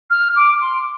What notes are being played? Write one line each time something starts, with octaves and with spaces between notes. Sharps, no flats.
F6
D6
C6